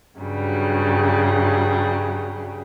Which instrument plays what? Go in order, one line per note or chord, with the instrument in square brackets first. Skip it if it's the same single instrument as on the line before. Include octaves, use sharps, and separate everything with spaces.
[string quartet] G2 C#3 F#3 G3